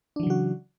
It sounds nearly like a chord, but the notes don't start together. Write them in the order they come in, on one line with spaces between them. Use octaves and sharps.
D4 E3 F#3 C#3 F#4